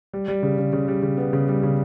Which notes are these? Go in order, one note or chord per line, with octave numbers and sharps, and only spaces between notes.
G3
G3
C#3
C#3
C#3
G3
C#3
B3
C#3
G3
C#3